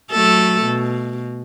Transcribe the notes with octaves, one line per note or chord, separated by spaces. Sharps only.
F#3 A3 A4
B2